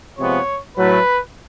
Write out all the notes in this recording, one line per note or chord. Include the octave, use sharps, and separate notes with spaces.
C3 F3 G#3 B3 C#5
A2 F#3 A3 B4